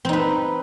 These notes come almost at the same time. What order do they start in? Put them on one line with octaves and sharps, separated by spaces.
C4 D#4 B4